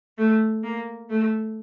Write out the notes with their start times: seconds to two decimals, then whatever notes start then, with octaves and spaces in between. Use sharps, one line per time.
0.18 A3
0.64 A#3
1.10 A3